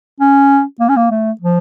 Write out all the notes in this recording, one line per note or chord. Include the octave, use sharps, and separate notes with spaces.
C#4
A#3
C#4
A#3
A3
F3